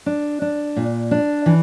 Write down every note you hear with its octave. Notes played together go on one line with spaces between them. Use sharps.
D4
D4
A#2
D4
E3